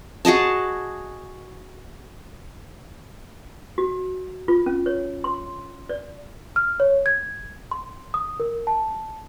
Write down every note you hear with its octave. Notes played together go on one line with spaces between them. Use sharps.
F#4 G#4 D#5 A5
F#4
F4
C#4
C#5
C6
D5
F6
C#5
G#6
C6
D#6
A#4
A5